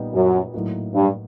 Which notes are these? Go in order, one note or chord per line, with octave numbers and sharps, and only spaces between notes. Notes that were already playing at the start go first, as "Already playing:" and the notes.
Already playing: A#2 G3 B3 D#4
F#2
A2 F#3 A#3 D#4 F#4
G2